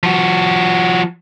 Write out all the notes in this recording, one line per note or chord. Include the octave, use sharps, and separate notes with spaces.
F3 F#4